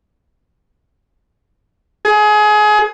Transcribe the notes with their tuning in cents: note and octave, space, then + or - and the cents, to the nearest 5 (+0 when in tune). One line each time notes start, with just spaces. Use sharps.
G#4 +25